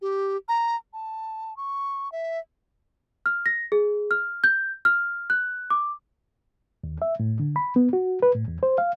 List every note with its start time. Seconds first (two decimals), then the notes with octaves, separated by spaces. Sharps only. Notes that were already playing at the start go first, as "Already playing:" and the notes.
0.02 G4
0.48 A#5
0.93 A5
1.57 C#6
2.12 E5
3.26 F6
3.46 A#6
3.72 G#4
4.11 F6
4.44 G6
4.85 F6
5.30 F#6
5.70 D6
6.84 D#2
7.02 E5
7.20 A2
7.40 D3
7.56 B5
7.76 B3
7.93 F#4
8.23 B4
8.35 A2
8.48 E2
8.63 C5
8.78 F5